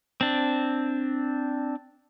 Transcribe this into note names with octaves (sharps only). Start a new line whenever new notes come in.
C4 D4